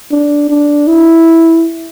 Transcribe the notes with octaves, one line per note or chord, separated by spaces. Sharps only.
D4
D4
E4